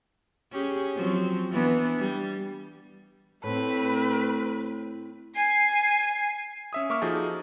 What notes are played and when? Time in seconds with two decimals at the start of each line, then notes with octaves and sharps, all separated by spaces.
0.52 C#4 G4 G#4
0.96 F3 F#3 C4
1.52 E3 B3 D4
1.99 G3
3.44 A2 A3 C4 B4
5.36 G#5 C7
6.73 C#4 E5 D#6
6.90 A#3 E5 C#6 D6 F6
7.02 F3 D#4 F#4 G#4 A4